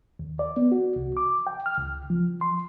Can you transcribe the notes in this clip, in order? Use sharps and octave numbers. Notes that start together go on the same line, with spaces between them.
D#2
D5
B3
F#4
C2
D6
G5
F6
C#2
F3
C6